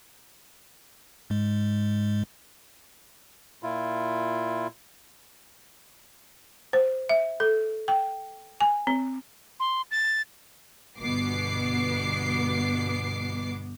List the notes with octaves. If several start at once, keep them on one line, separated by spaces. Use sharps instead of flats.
G#2 G#3
A#2 E4 F4
C5
E5
A4
G5
G#5
C4
C6
A6
G1 B2 B3 D6 C7